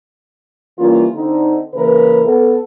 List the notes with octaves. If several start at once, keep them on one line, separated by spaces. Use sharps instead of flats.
E3 G3 A#3 C#4 F4
D3 C4 D#4
C#3 E3 A#3 G#4 A#4 B4
B3 A4